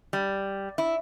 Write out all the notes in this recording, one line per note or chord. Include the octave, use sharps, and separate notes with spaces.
G3
E4